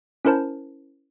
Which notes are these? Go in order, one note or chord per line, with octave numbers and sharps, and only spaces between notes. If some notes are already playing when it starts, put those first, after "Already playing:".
C#4 E4 A#4 C5 A5